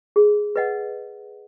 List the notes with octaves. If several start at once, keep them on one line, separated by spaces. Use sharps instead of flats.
G#4
B4 D#5 F#5